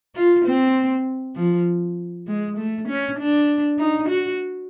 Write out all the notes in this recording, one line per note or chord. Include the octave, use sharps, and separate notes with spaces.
F4
C4
F3
G#3
A3
C#4
D4
D#4
F#4